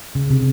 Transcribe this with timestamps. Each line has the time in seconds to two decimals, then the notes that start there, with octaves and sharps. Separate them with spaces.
0.15 C#3
0.30 C3